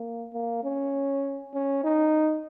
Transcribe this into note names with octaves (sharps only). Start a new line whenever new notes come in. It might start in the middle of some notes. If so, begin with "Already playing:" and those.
Already playing: A#3
A#3
C#4
C#4
D#4